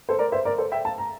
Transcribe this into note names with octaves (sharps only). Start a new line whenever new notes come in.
A4 C5
A#4 D5
C5 E5
A#4 D5
A4 C5
E5 G5
F5 A5
A#5